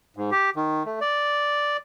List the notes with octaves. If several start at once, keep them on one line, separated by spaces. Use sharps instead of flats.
G#2
G4
D#3
A3
D5